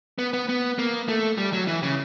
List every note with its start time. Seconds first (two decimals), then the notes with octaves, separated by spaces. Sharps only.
0.19 B3
0.33 B3
0.49 B3
0.79 A#3
1.08 A3
1.38 G3
1.53 F#3
1.68 E3
1.83 C#3